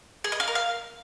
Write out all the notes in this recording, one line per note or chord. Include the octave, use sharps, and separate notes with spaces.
G#4
D#5
F5
A#4
F5